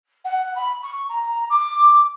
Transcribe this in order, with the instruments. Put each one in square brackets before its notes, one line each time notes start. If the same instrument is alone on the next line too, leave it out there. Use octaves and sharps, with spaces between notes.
[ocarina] F#5
B5
C#6
A#5
D6